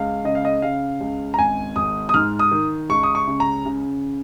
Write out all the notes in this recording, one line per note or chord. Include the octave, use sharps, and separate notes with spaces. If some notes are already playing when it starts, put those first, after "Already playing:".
Already playing: C#2 F5
C#3 D#5
F5
D#5
C#3 F5
C#2
A#5
G#1 G#5
G#1 D#6
D#6
G#2 F6
D#6
D#3
C#2 C#6
D#6
C#6
C#3
A#5
C#3